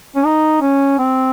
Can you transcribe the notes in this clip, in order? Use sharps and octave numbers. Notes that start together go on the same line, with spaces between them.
C#4
D#4
C#4
C4